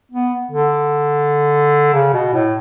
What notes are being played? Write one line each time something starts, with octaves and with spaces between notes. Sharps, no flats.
B3
D3
C#3
B2
A2